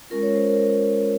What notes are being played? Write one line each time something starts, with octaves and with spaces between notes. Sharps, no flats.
G#3 C#4 F4 A#4
C#5
C5
A#4